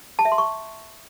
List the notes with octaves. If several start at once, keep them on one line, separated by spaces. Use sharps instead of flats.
A5
E5
C6
C#6